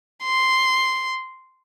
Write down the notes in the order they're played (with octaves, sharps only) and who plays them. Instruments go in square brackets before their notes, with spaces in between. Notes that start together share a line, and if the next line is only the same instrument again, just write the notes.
[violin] C6